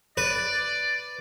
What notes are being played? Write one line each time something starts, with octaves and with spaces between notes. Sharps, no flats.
B4 D5